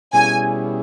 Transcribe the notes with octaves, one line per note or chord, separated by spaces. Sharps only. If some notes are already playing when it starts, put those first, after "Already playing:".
B2 G3 C#4 E4 G#4 G#5